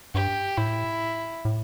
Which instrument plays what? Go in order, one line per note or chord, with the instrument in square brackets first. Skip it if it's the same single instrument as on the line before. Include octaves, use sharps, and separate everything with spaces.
[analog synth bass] G2 [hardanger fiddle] G4
[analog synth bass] A2 [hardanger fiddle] E4
[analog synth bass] A2